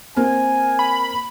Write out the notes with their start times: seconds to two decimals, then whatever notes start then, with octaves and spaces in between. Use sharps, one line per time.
0.16 A#3 C4 A#4 G#5
0.79 B5